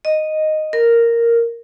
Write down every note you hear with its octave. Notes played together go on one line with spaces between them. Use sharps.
D#5
A#4